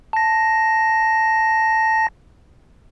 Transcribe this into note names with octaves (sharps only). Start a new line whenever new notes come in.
A5 A#6